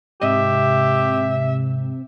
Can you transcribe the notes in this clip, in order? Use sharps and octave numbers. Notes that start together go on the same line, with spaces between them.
G#2 C3 G4 D#5 E5